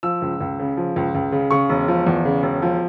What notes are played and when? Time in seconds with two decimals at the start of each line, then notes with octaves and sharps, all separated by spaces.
0.03 F3 E6
0.22 C#2
0.41 C#2
0.59 C#3
0.77 F3
0.96 C#2
1.15 C#2
1.32 C#3
1.51 C#3 C#6
1.70 E1
1.88 F3
2.07 E2
2.25 C#3
2.43 E1
2.62 F3